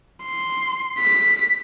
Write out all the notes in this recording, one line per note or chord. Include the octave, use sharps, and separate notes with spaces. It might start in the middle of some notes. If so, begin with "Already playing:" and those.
C6
B6